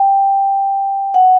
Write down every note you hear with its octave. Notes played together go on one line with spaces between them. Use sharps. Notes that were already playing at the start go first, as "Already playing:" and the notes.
Already playing: G5
F#5